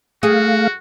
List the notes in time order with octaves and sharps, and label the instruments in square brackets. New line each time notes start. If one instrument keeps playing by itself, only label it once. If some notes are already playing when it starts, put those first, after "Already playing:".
[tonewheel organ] A3 F5 [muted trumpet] F#4 [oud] G#4